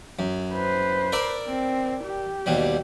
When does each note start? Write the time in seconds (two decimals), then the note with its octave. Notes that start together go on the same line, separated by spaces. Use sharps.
0.19 F#2
0.53 B4 C5
1.12 A#4 D5 E5
1.47 C4
2.04 G4
2.46 D#2 B2 G3